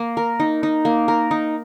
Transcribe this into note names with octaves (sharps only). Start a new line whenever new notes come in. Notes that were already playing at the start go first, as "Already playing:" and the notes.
Already playing: A#3
A#4
D#4
D#4
A#3
A#4
D#4